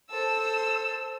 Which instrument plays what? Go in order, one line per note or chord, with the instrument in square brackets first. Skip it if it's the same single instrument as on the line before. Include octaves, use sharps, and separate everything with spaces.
[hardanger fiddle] A4 C5 [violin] E6